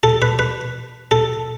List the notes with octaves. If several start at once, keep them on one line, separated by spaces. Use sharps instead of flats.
A4
B4
B4
A4